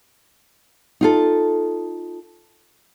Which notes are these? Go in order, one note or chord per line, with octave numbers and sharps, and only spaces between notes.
D#4 F4 A4